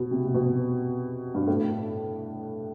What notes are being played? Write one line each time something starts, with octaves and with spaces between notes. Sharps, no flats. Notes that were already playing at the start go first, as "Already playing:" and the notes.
Already playing: B2
C3
C3
B2
G2
A2